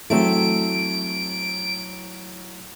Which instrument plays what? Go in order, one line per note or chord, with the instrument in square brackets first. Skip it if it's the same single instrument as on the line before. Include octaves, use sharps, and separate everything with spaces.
[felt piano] E3 F#3 [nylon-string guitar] A3 C4 [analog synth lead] D7